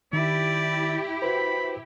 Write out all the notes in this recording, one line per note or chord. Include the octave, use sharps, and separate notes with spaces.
D#3 E4 G4 D5
F#4 B4 C5 B5